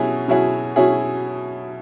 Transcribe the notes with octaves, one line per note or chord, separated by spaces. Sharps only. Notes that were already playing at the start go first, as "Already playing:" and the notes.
Already playing: B2 F#3 C#4 E4 G#4
B2 F#3 C#4 E4 G#4
B2 F#3 C#4 E4 G#4